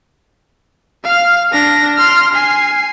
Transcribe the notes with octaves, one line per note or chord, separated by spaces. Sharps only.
F5 F6
D4 A#6
C6 F6
G#5 C7